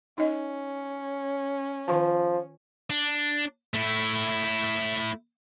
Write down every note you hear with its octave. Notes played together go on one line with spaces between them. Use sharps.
C#4 D#4 D#5
D#3 F3 F4 A5
D4
A3 E4